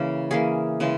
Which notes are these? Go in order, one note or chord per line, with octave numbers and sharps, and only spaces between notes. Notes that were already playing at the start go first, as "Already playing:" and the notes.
Already playing: C#3 E3 A#3 C#4
E3 A#3 C#4 G#4
C#3 E3 G#3